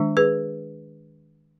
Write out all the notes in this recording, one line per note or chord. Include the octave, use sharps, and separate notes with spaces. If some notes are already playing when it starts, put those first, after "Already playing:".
Already playing: D#3 G#3 D4
G#4 B4